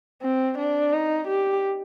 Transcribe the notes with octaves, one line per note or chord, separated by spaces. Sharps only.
C4
D4
D#4
G4